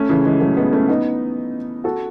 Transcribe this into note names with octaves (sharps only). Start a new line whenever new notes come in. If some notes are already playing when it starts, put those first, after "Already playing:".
Already playing: A3 C#4
C#3 E3
E3 G#3
F#3 A3
G#3 B3
A3 C#4
B3 D#4
F#4 A4